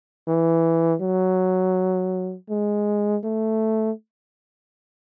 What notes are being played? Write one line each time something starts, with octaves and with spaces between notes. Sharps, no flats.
E3
F#3
G#3
A3